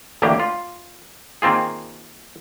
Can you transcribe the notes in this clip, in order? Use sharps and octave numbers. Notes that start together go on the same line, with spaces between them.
A1 D2 A2 A#3 G4
F4
D#3 A#3 C4 F4 G#4